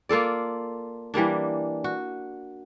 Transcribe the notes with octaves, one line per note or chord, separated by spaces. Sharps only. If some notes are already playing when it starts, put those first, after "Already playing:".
A#3 F4 A4 D5
E3 G3 A#3 D4
F#4